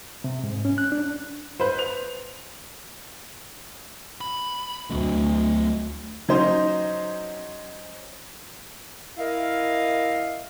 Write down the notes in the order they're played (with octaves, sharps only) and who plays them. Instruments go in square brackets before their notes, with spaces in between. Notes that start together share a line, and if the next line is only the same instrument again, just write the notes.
[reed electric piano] C3
G#2
C#4
F#6
D4
[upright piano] B4 C5
F7
[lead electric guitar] B5
[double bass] D2 [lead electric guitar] F#3 A3
[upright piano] F#3 C#4 D#4 C5
[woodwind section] E4 A#4 D#5 F5